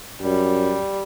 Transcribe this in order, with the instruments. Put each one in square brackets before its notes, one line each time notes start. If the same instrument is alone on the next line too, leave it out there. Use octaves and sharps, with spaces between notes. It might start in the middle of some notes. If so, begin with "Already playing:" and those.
[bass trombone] F#2 [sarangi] G3